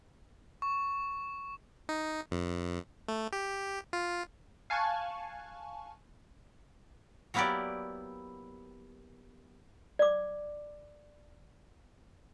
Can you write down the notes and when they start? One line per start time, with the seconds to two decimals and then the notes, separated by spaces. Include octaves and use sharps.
0.62 C#6
1.89 D#4
2.31 F2
3.08 A3
3.33 G4
3.93 F4
4.70 F5 G#5 A5 C#6 F#6 G#6
7.34 F#3 A#3 B3 E4 G4 D5
9.99 D5 D6